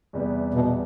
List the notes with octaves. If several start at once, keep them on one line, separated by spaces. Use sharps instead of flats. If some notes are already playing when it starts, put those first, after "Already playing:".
E2 C3 G3 B3
B2